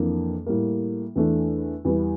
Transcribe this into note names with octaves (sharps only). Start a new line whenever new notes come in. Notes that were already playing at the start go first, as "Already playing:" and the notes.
Already playing: F2 E3 A#3 D4
A2 G3 A#3
E2 E3 A3 D4
E2 E3 G3